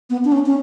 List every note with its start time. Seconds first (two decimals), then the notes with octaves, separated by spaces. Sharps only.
0.10 B3
0.25 D4
0.32 C#4
0.46 C#4